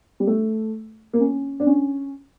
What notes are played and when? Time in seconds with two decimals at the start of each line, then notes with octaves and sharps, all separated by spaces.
0.20 G3
0.27 A3
1.13 A#3
1.20 C#4
1.60 D4
1.67 C#4